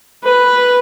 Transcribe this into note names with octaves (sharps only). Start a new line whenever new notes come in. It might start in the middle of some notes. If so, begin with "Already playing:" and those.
B4